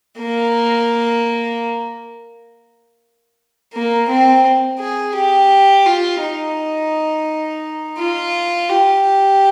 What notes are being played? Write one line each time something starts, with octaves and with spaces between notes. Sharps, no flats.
A#3
A#3
C4
G#4
G4
F4
D#4
F4
G4